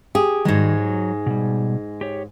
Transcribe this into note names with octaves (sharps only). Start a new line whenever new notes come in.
G4 G#4
G#2 D#3 G3 G#3 F#4
F#3
B2 G3
G4 C#5